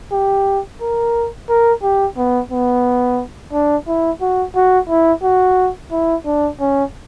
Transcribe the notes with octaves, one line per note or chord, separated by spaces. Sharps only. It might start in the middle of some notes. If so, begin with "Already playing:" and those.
G4
A#4
A#4
G4
B3
B3
D4
E4
F#4
F#4
E4
F#4
E4
D4
C#4